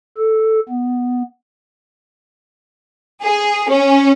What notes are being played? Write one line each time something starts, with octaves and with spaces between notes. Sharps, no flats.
A4
B3
G#4
C#4